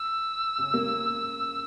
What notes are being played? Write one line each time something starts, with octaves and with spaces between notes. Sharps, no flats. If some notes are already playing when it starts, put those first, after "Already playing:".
Already playing: E6
C#3 C#4
A#3